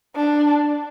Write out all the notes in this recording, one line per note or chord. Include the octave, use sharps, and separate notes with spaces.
D4